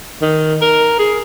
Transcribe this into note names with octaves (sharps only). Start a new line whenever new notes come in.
D#3
A#4
G#4